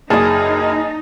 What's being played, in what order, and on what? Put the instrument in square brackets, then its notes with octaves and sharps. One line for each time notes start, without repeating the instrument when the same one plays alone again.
[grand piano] F#1 [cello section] D#4 [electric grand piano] G#4 [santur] A5 D#6